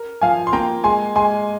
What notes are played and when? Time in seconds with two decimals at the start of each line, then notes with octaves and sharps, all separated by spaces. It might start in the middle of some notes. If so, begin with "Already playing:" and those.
Already playing: A#4
0.21 F3 F5 G#5
0.47 C6
0.53 A#3 G5 A#5
0.84 G#3 G#5 C6
1.15 G#3 G#5 C6